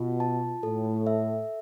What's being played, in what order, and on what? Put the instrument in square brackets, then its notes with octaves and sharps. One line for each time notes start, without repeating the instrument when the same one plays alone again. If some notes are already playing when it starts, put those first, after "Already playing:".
Already playing: [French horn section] B2 [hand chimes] F4
[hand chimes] A5
[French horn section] A2 [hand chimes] A4
[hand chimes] E5